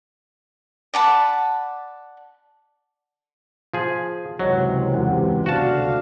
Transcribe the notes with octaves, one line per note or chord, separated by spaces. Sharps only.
D5 F#5 A5 B5
F3 G#4
C#2 F#2 C3 E3 F#3 C#5 D#5
E1 G2 F#5
D2 B2 D4 F#4 F5 A5